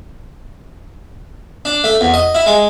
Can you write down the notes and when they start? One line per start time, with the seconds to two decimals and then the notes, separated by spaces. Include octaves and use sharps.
1.65 D4
1.84 A3
2.01 E2
2.14 D#5
2.35 E4
2.46 G#3